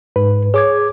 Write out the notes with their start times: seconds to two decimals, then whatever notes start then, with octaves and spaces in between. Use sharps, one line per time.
0.16 G#2 B4
0.54 G#4 C#5 D6 G#6